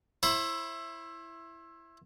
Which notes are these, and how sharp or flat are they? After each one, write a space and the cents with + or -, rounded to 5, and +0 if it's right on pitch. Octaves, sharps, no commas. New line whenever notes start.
E4 +10 C5 +40